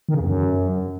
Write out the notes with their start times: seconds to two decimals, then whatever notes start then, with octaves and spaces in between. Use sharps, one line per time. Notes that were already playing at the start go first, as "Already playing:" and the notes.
0.09 D#3
0.14 C#3
0.20 E2
0.26 F#2